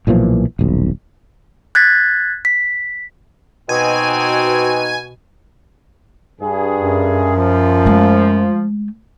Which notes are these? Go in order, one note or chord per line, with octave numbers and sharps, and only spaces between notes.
B1 A#2 E3 F3
D#1 B1
F#6 G#6 A6 B6
B6
B2 C4 D#4 F#4 G#5
G2 G#4
F#2
F3
G#3 A3